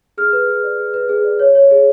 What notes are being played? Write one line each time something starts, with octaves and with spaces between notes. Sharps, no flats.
G#4 F6
B4
G#4
D5
G#4
B4
G#4
D5
C#5
C#5
G#4